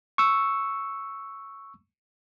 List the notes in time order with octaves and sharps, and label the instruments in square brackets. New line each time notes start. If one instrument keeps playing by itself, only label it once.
[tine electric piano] C#6 E6